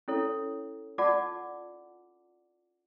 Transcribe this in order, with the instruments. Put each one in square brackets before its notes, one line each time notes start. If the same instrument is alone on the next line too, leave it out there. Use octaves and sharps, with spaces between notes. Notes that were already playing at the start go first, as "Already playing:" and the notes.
[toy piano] C#4 E4 A4 C#5
F4 D5 F#5 A5 D6